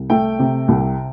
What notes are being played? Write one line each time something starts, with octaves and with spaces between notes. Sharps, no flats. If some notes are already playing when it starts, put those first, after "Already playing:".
Already playing: C2
A3 G5
C3
C2